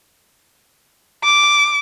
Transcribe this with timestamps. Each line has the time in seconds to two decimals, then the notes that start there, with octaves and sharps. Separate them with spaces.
1.24 D6